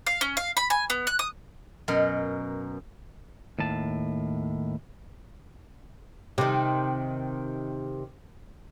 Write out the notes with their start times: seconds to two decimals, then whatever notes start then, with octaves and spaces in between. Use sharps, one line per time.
0.07 F5
0.21 C#4
0.37 F5
0.57 B5
0.70 G#5
0.90 B3
1.07 F#6
1.19 D#6
1.88 F#2 B2 A#4
3.59 D#2 A2 A5
6.38 C3 D#3